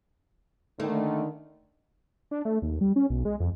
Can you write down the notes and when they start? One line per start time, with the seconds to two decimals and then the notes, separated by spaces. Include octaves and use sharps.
0.80 D3 D#3 A3 A#3
2.31 D4
2.45 A3
2.62 D#2
2.81 G3
2.96 C#4
3.10 B1
3.25 G#3
3.40 F2